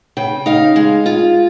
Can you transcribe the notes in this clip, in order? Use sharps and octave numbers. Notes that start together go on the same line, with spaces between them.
C#3 G5
D#4 F5
G#3
F4